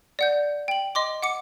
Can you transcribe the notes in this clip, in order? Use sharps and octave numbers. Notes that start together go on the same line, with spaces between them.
D5 F#5 G6
G5 F#7
D#5 C6 D6
F#5 D6 C#7